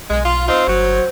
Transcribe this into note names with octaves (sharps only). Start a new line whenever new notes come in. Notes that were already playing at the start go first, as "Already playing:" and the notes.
B1 G#3
F4
C4 D#4 F4 C5
G1 F#3